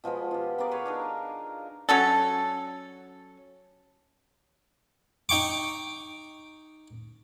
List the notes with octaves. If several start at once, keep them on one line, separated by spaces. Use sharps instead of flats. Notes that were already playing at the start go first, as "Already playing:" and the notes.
B2 F3 G#3 B3
F4 G4
B3 G#4 A#4 D5
B4 C#5 F5
D4 D#4 A#4
F#3 C#4 A4
D#4 G5 C#6 D6